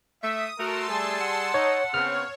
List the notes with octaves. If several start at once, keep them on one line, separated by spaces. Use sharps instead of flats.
A3 E5 D#6
A3 F#4 A#4 A5 C6 E6
G3 G#4
F#5
D#4 C#5
C#3 B3 C4 C#5 F6